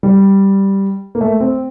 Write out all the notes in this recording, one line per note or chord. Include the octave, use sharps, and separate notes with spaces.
G3
A#3
A3
C4